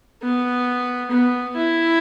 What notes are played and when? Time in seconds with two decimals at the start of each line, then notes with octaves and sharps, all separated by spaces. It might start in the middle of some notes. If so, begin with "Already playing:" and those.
0.22 B3
1.11 B3
1.56 E4